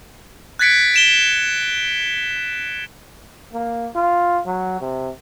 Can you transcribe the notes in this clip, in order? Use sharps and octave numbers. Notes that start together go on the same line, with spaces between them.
F#6 G#6 A6 B6 C#7 D7
D7 E7 G7
A#3
F4
F#3
C3